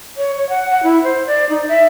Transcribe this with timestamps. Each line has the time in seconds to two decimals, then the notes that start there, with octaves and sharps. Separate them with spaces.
0.17 C#5
0.37 C#5
0.49 F#5
0.71 F#5
0.83 E4
1.04 C5
1.27 D5
1.49 D#4
1.68 E5